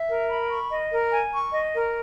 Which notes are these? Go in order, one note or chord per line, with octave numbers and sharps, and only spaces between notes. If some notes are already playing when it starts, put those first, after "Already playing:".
Already playing: E5
A#4
B5
C#6
D#5
A#4
G#5
C#6
D#5
A#4